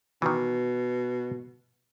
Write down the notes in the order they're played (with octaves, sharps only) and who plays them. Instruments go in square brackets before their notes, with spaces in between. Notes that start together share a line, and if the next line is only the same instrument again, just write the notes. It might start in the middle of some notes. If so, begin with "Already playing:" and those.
[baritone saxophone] B2 [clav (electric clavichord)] D#3 E3